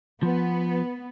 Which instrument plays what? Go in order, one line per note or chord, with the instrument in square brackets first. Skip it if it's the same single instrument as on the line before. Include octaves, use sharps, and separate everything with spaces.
[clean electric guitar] F3 [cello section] B3